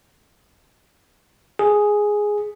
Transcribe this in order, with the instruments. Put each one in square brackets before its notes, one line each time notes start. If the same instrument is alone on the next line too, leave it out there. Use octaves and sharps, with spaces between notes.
[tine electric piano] G#4